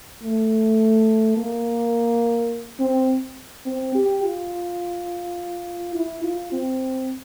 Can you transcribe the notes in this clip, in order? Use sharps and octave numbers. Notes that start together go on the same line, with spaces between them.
A3
A#3
C4
C4
G4
F4
E4
F4
C4